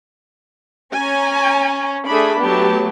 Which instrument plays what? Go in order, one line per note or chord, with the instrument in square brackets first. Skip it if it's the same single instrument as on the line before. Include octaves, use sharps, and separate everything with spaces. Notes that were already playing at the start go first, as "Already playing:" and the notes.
[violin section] C#4 [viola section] G#5 A#5
[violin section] A3 B5 [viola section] D4 G#4
[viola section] F#3 A3 G4 [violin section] B3 A5